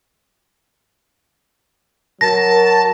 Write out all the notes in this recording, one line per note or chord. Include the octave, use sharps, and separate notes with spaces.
F#3 A#4 A5 A#6